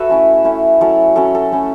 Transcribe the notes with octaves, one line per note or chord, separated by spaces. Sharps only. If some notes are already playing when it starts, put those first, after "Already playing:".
Already playing: F#4 A4 B4 C#5 E5
A3 C#4 E4
A3 C#4 E4
F#3 C#4 E4 A4 C#5
F#3 C#4 E4 A4
A4
A3 C#4 E4